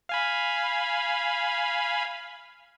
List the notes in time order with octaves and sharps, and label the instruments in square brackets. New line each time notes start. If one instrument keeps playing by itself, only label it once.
[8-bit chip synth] F5 G#5 B5